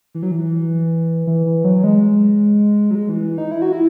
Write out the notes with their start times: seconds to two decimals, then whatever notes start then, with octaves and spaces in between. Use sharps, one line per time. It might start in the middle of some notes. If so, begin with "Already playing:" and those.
0.15 E3
0.23 F#3
0.31 E3
1.27 E3
1.46 E3
1.64 F#3
1.84 G#3
2.91 F#3
2.95 G#3
3.09 E3
3.24 E3
3.38 D#4
3.51 E4
3.62 F#4
3.73 E4